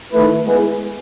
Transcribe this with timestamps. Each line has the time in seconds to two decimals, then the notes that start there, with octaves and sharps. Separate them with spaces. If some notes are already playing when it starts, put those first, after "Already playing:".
0.12 D#3 A3 E4 B4
0.45 G#3 B3 E4 G#4 B4